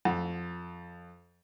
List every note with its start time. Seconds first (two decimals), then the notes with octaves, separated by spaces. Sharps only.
0.05 F2